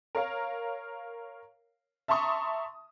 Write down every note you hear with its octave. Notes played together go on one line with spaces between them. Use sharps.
A#4 C#5 F5
E5 A5 A#5 C6 C#6 D#6